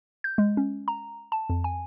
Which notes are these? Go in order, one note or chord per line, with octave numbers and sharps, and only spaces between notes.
G6
G#3
C#4
A#5
A5
F2
G#5